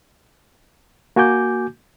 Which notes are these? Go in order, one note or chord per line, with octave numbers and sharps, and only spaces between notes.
A#3 F#4 G#5 D6 G6